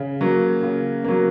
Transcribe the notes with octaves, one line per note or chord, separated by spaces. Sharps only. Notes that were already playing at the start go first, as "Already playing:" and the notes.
Already playing: C#3
F#3 A#3
C#3
F#3 A#3